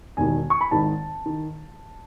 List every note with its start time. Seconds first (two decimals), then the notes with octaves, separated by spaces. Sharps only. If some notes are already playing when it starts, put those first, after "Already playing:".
0.17 E1 D#2 D#3 G#5
0.50 C#6
0.61 B5
0.71 G#1 G#2 D#3 A5
1.26 D#3